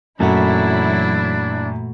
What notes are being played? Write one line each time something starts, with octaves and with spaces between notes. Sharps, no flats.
F#2 A#2 E3 F#3 A3 D4 E4 F#4